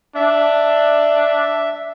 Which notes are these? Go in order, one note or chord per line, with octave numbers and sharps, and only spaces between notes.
D4 E5